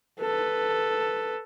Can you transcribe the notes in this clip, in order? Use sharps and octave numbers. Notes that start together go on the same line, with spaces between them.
A4 B4